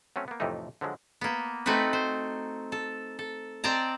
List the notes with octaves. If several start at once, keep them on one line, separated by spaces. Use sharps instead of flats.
F#3 A3 C4 C#4
A#3 B3
F2 A2 C3 E3 A3 D#4
D3 F3 F#3 G#3
A#3 B3
A3 C4 D#4 F#4 B4
C5
A4
A4
C4 D5 D#5 A5 A#5